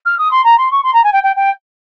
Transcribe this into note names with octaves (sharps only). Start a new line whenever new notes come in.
F6
D#6
C6
A#5
C6
C#6
C6
A#5
G#5
G5
G5
G5